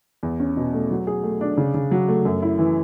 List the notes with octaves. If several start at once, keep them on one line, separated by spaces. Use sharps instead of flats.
E2
C#4
B2
A3
F#3
G#4
A3
D4
C#3
C#3
F#3
A3
F#2
E4
E3